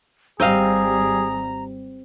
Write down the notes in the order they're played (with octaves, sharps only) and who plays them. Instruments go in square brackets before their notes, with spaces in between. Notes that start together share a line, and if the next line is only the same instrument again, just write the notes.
[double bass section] G#1 G3 [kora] C4 D#5 F5 [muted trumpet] G#4 [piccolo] A#5